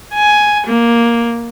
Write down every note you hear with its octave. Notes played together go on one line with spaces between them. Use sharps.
G#5
A#3